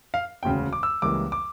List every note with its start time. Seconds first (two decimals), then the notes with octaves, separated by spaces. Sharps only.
0.14 F5
0.43 E1 D2 C#3 G5
0.73 D6
0.83 E6
1.02 C#2 C#3 E3 G3 A#3 D6
1.32 D6